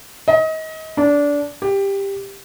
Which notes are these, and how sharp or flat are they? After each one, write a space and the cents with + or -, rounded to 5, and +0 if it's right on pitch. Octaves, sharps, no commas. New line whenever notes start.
D#5 +30
D4 -20
G4 +10